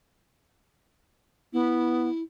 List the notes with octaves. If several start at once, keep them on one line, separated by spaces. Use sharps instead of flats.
B3 E4